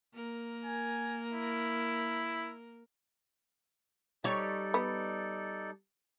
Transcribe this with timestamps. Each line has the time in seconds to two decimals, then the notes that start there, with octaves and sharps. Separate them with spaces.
0.14 A#3 A#4
0.65 G#5
1.33 E4
4.24 G3 D#4 A4 C#5 D5
4.74 B3